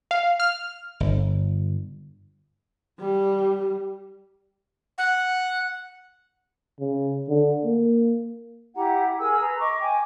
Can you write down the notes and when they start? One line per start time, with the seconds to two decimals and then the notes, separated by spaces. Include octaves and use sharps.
0.11 F5
0.40 F6
1.00 G1
3.00 G3
4.98 F#5
6.80 C#3
7.29 D3
7.65 A#3
8.75 E4 G4 F#5 A#5
9.19 G#4 A#4 G#5 E6
9.40 B4 A#5
9.58 D#5 C#6 D6
9.79 G5 G#5 D6